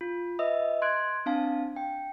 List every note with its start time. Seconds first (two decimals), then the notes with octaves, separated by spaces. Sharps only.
0.01 F4
0.39 B4 D#5 E5 D#6 E6
0.82 C6 F#6 G#6 D7
1.26 C4 D4 F5 A5
1.76 G5